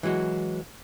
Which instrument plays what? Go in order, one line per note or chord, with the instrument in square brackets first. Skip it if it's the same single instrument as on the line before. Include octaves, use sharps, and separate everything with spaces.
[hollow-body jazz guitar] E3 F#3 G#3 F#4